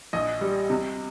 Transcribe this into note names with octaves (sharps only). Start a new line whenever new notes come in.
A#1 D#5
G3
C3